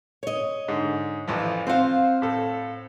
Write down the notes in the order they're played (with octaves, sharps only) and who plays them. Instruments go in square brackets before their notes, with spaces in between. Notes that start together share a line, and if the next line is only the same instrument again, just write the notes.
[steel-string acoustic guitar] C#5 D#5
[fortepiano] G#2 D3
A1 E3 F3
[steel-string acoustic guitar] C4 F5 [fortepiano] F4 C5 F#5
[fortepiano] A2 A4